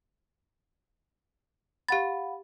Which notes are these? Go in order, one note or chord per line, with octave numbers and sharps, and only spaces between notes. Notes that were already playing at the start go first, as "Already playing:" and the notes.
G4 F5 F#5 B5 A6